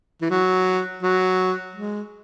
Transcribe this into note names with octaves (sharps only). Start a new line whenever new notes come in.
E3
F#3
F#3
G#3